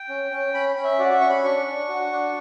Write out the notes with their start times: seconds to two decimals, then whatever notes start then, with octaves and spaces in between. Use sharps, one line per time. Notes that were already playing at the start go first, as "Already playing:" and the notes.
Already playing: G5
0.09 C#4
0.31 C#4
0.54 C#4 B5
0.69 B5
0.76 C#4
0.84 E5
0.98 F#4 D5
1.13 E5
1.21 C#4 C#6
1.29 B5
1.43 D4 C#6
1.67 D4
1.88 F#4
2.12 D4